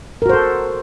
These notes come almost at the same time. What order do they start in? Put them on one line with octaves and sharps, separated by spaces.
A#4 F#4 C5 A4